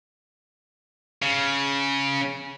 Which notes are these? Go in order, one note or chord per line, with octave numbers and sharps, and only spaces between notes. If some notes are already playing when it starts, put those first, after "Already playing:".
C#3